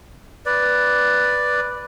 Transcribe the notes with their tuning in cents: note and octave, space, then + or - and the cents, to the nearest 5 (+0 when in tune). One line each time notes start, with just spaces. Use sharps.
B4 +0 D5 +0